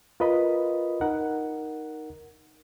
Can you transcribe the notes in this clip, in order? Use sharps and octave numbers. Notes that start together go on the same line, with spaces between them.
F4 A#4 B4 D#5 B5
D#4 A#4 F#5